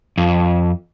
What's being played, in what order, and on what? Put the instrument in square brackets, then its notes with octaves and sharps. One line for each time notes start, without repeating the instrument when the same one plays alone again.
[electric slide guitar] F2